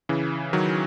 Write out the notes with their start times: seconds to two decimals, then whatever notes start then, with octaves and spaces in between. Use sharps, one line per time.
0.09 C#3 E3
0.53 D#3 F#3